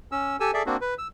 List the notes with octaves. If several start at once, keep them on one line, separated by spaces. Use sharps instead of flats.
C#4 E6
G4 A4 G#5 E6
G#4 A4 D5 E5
A#3 C4 D4 F#4
B4
E6